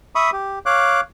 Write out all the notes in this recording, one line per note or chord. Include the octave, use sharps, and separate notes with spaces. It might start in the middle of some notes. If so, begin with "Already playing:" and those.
E5 B5 C#6 D#6
G4
C#5 F5 D6 F#6